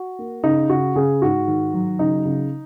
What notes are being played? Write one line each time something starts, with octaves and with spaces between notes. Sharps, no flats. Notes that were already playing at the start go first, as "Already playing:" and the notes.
Already playing: F#4
A#3
C#3 D#4
C#3 F#4
C#3 G#4
G#2 F#4
D#3
F#3
C#3 D#4
C#3